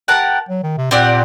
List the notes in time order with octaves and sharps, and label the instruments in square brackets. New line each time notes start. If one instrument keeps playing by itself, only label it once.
[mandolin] G4 A#4 F#5 A5
[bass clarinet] F#3
D#3
C3
[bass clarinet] A#2 [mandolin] C4 G4 D5 F#5